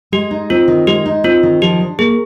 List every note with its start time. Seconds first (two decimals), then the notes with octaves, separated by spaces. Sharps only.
0.12 G#3 G4
0.31 D#4
0.50 C4 F4
0.68 D#3
0.87 G#3 G4
1.06 D#4
1.24 C4 F4
1.43 D#3
1.62 F3 G4
1.81 D4
1.99 A#3 G#4